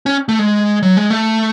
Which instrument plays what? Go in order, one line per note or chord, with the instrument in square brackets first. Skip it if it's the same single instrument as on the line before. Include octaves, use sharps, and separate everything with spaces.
[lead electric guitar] C#4
A3
G#3
F#3
G#3
A3